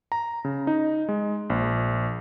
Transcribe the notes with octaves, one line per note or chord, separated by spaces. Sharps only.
A#5
C#3
D#4
G#3
A#1